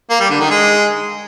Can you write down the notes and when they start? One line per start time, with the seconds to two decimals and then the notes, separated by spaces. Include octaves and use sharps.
0.10 A#3
0.20 G3
0.30 D3
0.40 D#3
0.50 G#3